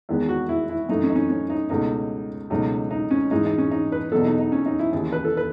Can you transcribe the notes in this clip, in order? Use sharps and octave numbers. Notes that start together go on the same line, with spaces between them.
E2 D#3 G#3 B3
F#4
E4
E4
F#2 E3 A3 D#4
C#4
D#4
C#4
C#4
D#4
C#2 B2 A3 D#4
C#2 B2 F#3 A3 D#4
D#4
C#4
G#2 E3 G#3 D#4
D#4
C#4
D#4
B4
E2 B2 F#3 B3 A4
D#4
D#4
C#4
D#4
E4
D#2 C#3 E3
B4
A4
B4